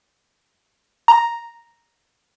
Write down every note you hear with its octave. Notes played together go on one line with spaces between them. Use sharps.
A#5